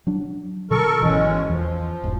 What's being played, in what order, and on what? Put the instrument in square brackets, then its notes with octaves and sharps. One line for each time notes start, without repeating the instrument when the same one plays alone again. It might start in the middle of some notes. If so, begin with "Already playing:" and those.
[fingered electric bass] F#3 D4
[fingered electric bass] B2 D3 F#3 [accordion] A4 A#4 C#6
[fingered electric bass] G#1 E3 [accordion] B2 G#3 C#4
[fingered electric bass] E2 [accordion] F3
[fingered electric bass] E1 G#2